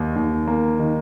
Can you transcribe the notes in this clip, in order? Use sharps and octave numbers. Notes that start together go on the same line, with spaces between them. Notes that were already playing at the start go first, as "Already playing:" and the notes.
Already playing: D#2 D#3
D#2
A#3
D#3